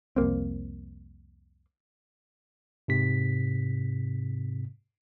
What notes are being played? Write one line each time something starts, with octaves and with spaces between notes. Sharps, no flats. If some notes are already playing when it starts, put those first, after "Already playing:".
C2 F2 A#3 C4
G#2 C3 B6